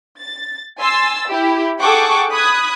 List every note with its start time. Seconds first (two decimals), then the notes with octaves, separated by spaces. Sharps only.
0.21 A6
0.80 G#5 C6 E6 A6
1.28 E4 G4
1.82 G#4 A4 F#5 G5 C#6 D6
2.32 B5 D#6 F#6 G#6